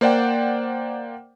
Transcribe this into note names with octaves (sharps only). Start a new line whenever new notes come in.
A#3 C5 D5 F#5 G5